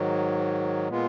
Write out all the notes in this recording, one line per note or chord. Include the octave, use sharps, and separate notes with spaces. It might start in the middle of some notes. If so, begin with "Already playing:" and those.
Already playing: G#2 D#3 F#3
A#2 G#3 B3 F4